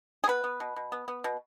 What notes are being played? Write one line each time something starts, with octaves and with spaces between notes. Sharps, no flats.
G#4
B3 B4
B3
B2
B2
B3
B3
B2